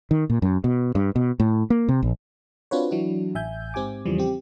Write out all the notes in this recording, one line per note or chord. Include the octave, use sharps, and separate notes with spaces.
D#3
A#2
F#2
B2
G2
B2
A2
A#3
C3
A#1
C4 D4 F4 F#4 B4 C#5
E3 F#3 D4 E4 F#4
A1 E5 G#5 G6
G#2 C4 G4 G#5 D6
E2 C#3 E3 F3 G3
C4 G4